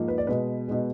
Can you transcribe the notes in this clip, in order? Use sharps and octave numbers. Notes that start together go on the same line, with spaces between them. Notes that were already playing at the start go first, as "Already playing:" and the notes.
Already playing: G#2 F3 A#3
B4
D5
B2 G#3 B4
B2 G#3